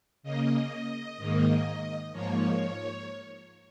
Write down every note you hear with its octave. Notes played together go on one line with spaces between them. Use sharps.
C#3 A#3 D#5
G#2 D#3 A#3
G#2 F3 A#3 C#5